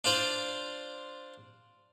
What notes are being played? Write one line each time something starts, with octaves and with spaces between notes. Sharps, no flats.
D4 F4 C5 D5